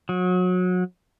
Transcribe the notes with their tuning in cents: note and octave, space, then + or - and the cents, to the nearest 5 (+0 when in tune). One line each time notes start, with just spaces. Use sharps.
F#3 -30